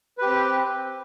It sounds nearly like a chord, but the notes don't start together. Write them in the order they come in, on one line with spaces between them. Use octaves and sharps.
B4 G4 C4